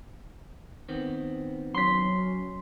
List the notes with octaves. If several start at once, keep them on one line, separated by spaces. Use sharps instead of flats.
D#3 B3 C4
F#3 C#4 C6 B6